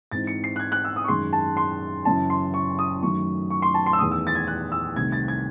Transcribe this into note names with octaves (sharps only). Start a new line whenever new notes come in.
G#2 E3 C4 D#4 A6
C#7
C7
F#6
G#6
F#6
E6
D#6
C#6
F#2 D#3 G#3 C6
A5
C6
F#1 F#2 E3 A5
C6
C#6
D#6
F#2 D#3 F#3 A3 C#6
C#6
C6
A5
C6
E6
E2 D#3 A3 D#6
E6
A6
G#6
F#6
E6
C2 C3 D#3 A3 G#6
A6
G#6